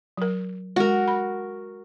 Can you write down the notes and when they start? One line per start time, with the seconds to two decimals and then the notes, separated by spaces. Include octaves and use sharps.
0.17 F#3 A#4
0.76 G#3 F#4 A#4
1.08 B5